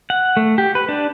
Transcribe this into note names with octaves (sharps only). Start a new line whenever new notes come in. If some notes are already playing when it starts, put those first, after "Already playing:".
F#5
A3
G4
B4
D4